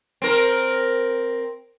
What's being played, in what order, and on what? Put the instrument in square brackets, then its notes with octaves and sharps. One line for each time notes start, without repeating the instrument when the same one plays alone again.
[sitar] C4 A#4